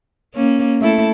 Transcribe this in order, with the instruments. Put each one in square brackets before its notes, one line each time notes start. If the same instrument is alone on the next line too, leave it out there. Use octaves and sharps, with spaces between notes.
[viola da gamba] A#3 C#4
A3 E4 A4